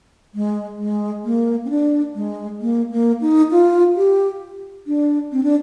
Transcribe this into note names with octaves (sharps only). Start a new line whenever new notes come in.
G#3
G#3
A#3
C4
D4
G#3
A#3
A#3
D#4
F4
G4
D4
C4
D4